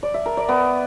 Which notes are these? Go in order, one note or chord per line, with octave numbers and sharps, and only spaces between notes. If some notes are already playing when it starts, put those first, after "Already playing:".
D5
E5
A#4
D5
B3